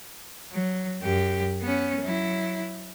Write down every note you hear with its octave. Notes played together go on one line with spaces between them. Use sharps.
F#3
F#2 G4
B3 C#4
F#3 E4